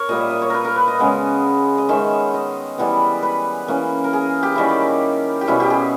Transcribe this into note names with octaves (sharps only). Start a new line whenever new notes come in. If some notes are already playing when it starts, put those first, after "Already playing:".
Already playing: A#4 C#5
A#2 G3 A#3 D#5
E5
D#5
C#5
A#4 B4
A#4
B4
D#5
C#3 G#3 B3
D#5
D#3 G#3 C#4 E5
D#5
E3 G3 B3
B4
E3 A#3 C#4
A#4
G#4
G4
D#3 G3 A#3 C#4 E4
G4
G4
B2 G3 C#4 E4
G4
G#4